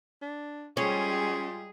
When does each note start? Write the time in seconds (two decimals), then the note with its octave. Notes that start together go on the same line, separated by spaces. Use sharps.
0.22 D4
0.77 G3 G#3 C#4 F4 G4 G#4